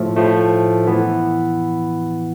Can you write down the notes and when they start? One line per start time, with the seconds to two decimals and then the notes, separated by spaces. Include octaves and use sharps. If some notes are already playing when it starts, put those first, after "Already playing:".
Already playing: A2 F3 A3
0.17 A2 F3 A3
0.87 E3 B3 E4